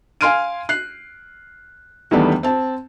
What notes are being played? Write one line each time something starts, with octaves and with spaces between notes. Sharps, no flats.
F5 G#5 C6 F6 D7 D#7
F#6 C7
E2 D#3 G3 A3 B3 D4
C4 A5